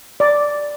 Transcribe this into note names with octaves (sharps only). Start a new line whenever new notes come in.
D5